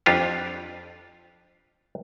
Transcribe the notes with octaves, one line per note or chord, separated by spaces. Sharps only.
F2 D4 F4 G4